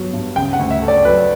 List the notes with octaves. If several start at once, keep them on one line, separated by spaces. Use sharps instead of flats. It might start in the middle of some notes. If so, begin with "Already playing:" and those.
Already playing: G2 F#3 B3
G2
C#3 G5
F#5
D2
E5
A3
D5
F#3 B4